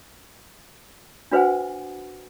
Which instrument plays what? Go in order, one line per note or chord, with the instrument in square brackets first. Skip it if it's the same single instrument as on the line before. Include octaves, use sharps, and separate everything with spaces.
[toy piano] D4 F#4 B4 C5 F#5 G#5